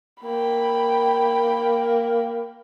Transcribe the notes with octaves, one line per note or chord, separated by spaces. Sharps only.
A#3 G5 B5